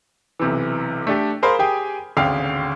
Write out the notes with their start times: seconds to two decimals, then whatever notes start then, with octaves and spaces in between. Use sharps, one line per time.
0.40 B1 C3 E3
1.07 A3 D4 G4 A4
1.42 G#4 A#4 C5 F5 B5 C6
1.59 G4 G#4 G5 G#5
2.17 G#1 D2 C#3 F5 G5